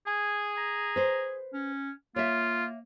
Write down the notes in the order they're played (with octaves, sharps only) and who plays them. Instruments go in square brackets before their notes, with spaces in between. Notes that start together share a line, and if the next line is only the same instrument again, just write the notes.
[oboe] G#4 [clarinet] G#5
[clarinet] A#5
[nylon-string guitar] B4 C5
[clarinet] C#4
[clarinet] A#3 [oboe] F4 [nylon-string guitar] C#5 E5